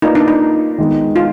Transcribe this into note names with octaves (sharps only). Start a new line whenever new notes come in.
A#3 D#4 F4 B4 D5
D4
D#4
D#3 G#3 B3
F4